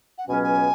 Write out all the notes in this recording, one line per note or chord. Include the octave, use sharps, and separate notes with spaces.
F#5
C#2 B2 F#3 C#4 G#5
G#5